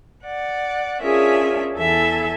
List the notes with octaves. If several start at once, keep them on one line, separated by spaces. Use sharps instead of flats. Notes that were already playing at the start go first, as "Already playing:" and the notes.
D5 F#5
C#4 D4 F4 G#4 A#4 E5
E2 E3 A4 E5 G#5